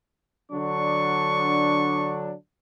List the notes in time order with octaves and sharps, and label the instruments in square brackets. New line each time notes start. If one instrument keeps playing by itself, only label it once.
[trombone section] D3 F#3 D4 [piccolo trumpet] C#6